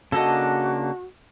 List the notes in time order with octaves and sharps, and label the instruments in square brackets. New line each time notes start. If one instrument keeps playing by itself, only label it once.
[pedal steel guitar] C#3 A#3 D4 [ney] F#4 [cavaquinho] A4 D#5